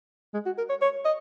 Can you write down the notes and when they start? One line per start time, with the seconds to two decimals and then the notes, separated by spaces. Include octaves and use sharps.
0.34 G#3
0.46 F#4
0.58 A#4
0.70 C#5
0.81 C#5
1.05 D#5